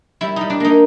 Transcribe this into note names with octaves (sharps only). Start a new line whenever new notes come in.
G3 E4
G3 D#4
D4
A#3 D#4